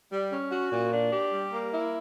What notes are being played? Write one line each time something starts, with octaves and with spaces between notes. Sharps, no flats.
G3
C#4
F#4
A#2
D4
G4
G3
A#3
E4